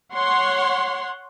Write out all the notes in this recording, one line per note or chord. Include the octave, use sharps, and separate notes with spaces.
C#5 F#5 C6